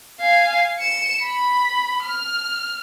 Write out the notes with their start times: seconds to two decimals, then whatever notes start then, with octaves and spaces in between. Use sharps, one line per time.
0.21 F5 G#5
0.79 C#7 E7
1.21 B5
2.04 F6